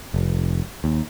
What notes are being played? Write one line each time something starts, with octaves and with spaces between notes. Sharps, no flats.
F1
D#2